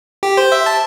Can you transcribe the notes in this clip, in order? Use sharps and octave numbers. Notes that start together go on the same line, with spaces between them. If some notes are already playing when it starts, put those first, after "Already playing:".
G4
C5
E5
A5